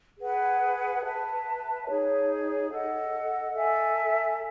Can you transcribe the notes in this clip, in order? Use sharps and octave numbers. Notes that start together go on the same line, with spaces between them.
G#4 B4 F#5
B4 E5 A5
D#4 G#4 C#5
A4 D#5 F#5
A4 E5 G#5